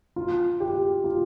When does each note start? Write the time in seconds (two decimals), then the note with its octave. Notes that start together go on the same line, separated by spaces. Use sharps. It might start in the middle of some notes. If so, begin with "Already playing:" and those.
0.16 F4
0.60 G4
1.04 F4